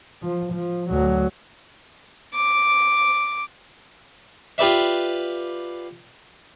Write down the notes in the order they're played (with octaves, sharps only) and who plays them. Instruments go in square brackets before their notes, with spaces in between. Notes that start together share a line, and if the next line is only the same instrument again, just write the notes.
[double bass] F3
F3
D2 F#3
[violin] D6
[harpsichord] F4 G4 B4 D5 E5